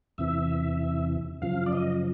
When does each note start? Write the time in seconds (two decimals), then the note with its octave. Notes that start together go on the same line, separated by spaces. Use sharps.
0.18 E2 C3 E3 E5
1.42 F#2 C#3 F3 F5
1.66 D5
1.73 D#5